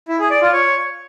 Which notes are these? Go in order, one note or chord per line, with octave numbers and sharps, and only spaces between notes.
E4
G#4
D5
F4
C#5